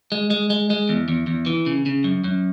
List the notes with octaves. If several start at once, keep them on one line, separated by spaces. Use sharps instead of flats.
G#3
G#3
G#3
G#3
E2
E2
E2
E3
C#3
C#3
F#2
F#2